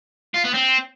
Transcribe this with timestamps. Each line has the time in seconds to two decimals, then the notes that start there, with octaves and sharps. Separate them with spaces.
0.34 F4
0.44 B3
0.54 C4